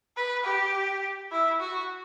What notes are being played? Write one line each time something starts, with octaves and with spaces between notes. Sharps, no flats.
B4
G4
E4
F#4